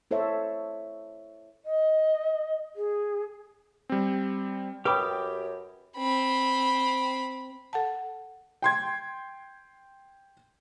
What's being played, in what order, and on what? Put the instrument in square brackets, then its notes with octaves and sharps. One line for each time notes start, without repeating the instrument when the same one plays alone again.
[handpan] E4 A4 C5 C#5 E5
[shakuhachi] D#5
G#4
[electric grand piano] G3 C4
[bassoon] F#2 [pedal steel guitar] G4 D6 [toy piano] B4 D#6 [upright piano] G5 B5
[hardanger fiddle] C4 B5
[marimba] A4 F#5 A5
[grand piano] G5 C6 G#6